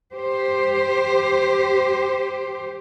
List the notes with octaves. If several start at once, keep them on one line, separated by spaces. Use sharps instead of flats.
G4 C5